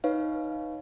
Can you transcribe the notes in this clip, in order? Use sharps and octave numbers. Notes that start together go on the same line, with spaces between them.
D#4 B4 C#5 F5